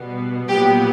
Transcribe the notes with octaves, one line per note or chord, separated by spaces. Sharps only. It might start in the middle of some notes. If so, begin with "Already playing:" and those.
Already playing: B2 G3 B3
A#2 F#3 B3 G4